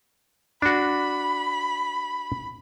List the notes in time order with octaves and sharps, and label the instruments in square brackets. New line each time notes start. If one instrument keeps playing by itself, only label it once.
[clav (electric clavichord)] D4 F#4 [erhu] B5